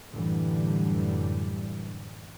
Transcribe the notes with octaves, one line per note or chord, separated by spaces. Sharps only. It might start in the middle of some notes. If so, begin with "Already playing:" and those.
F#2 A2 D3 E3 G3